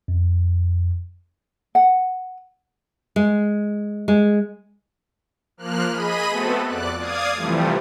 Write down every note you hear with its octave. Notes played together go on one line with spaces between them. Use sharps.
F2
F#5
G#3
G#3
F3 A#3 F6 F#6
G#4 D#5 B5 D#7
A3 B3 C4 F#4 A4
F2 D5 F#6
D5 F5 D#6 G#6
C3 E3 F3 G3 A3